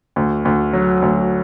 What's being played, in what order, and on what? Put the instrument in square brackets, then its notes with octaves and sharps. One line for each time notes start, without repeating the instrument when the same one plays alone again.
[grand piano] D2
D2
F#3
D2